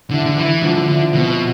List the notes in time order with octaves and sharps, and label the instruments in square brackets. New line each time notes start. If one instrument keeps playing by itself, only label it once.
[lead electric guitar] D3 [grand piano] E4
[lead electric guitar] D3
[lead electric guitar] E3 [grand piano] E4
[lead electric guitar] D3 [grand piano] F3
[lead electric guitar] D3
[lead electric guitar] D3 [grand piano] E4
[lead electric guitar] B2 [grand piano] C4